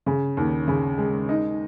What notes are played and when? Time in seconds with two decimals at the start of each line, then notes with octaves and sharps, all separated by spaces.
0.06 C#3
0.37 D#2
0.68 C#3
0.98 G#3
1.29 D#4